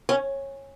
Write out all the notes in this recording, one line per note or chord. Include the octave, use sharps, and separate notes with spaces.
C#4